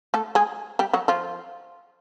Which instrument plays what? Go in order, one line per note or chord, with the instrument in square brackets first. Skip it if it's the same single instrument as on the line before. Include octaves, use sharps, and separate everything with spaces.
[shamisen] A3 A4
G#3 G#4
G3 G4
F#3 F#4
F3 F4